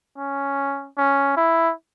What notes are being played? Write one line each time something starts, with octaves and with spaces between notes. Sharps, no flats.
C#4
C#4
E4